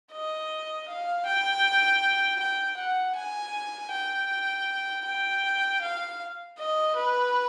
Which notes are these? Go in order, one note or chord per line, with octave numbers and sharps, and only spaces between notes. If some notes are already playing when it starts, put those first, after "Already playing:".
D#5
F5
G5
G5
F#5
G#5
G5
G5
F5
D#5
B4